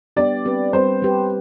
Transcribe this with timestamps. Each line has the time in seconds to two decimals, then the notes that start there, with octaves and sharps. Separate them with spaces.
0.17 G3 B3 D4 G4 D5
0.45 G3 C4 G4 B4
0.73 G3 C4 G4 B4 C5
1.02 G3 C4 G4 B4